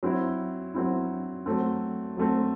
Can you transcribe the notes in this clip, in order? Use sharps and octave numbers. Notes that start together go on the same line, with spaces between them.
F#3 C4 E4
F#3 C4 E4
F#3 A3 C4
F#3 A3 C4